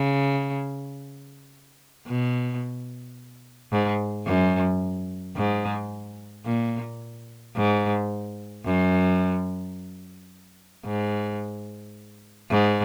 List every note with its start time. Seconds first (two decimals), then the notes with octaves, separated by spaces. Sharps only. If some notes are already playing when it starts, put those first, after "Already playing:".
Already playing: C#3
2.07 B2
3.72 G#2
4.26 F#2
5.36 G#2
6.46 A#2
7.56 G#2
8.66 F#2
10.85 G#2
12.50 G#2